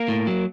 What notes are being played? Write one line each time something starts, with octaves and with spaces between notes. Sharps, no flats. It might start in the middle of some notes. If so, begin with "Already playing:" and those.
Already playing: A#3 A#4
A2
F#3